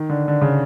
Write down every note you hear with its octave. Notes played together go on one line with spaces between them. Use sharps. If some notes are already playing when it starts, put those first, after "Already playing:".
Already playing: D#3
D3
D3
C#3